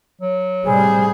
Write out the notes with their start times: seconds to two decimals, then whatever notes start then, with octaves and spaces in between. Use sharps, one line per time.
0.21 F#3
0.64 A2 C3 G3 G#4 C5